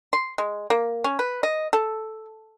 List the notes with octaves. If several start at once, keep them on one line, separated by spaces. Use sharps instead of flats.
C6
G#3
A#3
C#4
B4
D#5
A4